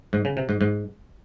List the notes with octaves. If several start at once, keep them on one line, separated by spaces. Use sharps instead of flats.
G#2
C#3
C3
G#2
G#2